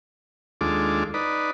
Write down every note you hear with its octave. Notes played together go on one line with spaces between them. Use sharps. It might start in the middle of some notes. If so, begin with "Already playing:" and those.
D#2 G#3 D4 F4 A4 D6
D#4 B4 D5